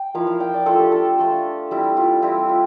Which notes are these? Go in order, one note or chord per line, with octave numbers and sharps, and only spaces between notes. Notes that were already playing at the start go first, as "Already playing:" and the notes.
Already playing: G5
F3 A#3 E4 F5
F5
G5
D5
A3 D4 F4 A4
G4
A4
A3 D4 F4
G3 C4 E4
F4
G3 C4 E4 G4
F4